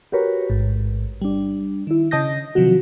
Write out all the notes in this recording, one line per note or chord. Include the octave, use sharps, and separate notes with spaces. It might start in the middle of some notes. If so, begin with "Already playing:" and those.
F#4 G4 A#4 B4 C#5
A1 G#2
G3 D4
D#3 E4
C#3 D#5 A5 D#6 G6 A#6
C3 D#3 F3 F#3 F#4